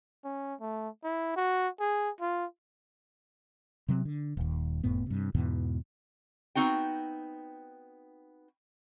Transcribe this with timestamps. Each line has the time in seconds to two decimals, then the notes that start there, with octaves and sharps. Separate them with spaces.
0.24 C#4
0.60 A3
1.04 E4
1.36 F#4
1.80 G#4
2.21 F4
3.88 C3 F#3 G#3 C4
4.05 D3
4.37 D#1 D#2
4.84 F#1 F2 A2 B3
5.06 G2 C3
5.35 E2 G#2 B2 E3
6.55 B3 C4 D#4 F#4 G5